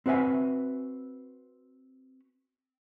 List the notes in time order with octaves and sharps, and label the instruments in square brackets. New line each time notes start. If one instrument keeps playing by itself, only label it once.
[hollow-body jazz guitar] C4 F#4 B4 E5 G#5